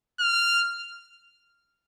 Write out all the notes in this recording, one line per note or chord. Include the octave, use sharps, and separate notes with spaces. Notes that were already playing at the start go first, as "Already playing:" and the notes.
F6